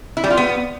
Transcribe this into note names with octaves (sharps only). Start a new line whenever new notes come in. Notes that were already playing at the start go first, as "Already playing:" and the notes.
E4
G3
F4
B3